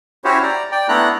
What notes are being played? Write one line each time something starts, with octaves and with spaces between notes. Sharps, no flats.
C#4 E4 F#4 G4 C5 C#5
D5 A#5
D5 G5
A3 B3 D4 E4 A#5 F#6